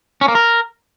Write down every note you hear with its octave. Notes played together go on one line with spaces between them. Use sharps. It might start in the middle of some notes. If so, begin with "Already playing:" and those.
C#4
A#3
A#4